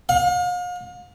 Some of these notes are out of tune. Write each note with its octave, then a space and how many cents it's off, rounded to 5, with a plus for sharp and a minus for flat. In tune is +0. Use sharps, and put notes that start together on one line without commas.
F5 +40